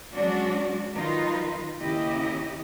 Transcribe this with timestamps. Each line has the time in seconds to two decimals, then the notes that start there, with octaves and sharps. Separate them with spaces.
0.14 F#3 G#3 C#4 D4 F#4 D5
0.93 D#3 F#3 D#4 F4 B4
1.81 D#2 C#3 E4 G4 D#5